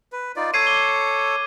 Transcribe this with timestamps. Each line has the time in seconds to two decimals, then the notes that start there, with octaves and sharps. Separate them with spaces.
0.12 B4
0.36 D#4 F4 D5
0.54 A4 C#5 G#6 C7 D#7
0.67 D6 G7